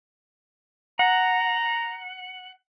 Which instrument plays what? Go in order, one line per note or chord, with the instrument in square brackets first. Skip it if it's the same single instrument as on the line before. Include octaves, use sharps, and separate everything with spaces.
[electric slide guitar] F#5 [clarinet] A#5